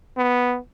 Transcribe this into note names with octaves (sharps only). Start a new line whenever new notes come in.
B3